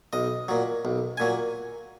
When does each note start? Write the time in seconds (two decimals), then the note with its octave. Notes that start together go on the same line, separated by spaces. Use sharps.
0.13 B1 D#5
0.49 A#2 F#3
0.85 B1
1.17 A#2 F#3 G#5